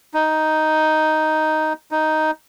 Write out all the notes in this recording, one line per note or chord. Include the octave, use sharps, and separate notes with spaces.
D#4
D#4